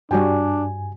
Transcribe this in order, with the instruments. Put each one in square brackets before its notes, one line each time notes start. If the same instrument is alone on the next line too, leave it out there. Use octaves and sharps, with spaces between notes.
[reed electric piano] G2 G#5 [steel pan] G3 F#4 G5 [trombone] D4